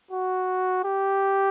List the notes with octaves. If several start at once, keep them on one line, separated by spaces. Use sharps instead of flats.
F#4
G4